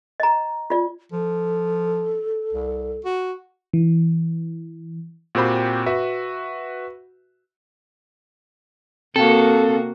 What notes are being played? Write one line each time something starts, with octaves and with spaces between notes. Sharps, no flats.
D#5 A#5
F4 D5
F3 A4
C2
F#4
E3
A#2 C4 F#4 G4 C5 B5
F#4 B4 E5
C3 A#3 C4 F#4 A4 F5